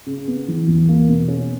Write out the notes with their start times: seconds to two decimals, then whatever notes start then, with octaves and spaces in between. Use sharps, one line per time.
0.06 C#3
0.28 B3
0.48 E3
0.67 E2
0.89 A#3
1.08 B2
1.28 C#4